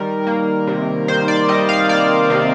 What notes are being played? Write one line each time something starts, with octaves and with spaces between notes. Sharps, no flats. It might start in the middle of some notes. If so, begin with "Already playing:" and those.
Already playing: D#3 G3 A#4
A#3
C3
D#3 C5
D5
G3 D#5
F5
A#3 D5
C3